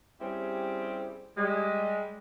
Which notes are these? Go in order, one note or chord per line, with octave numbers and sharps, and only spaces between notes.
G3 C4 C#4 E4 G4 G#4
G3 G#3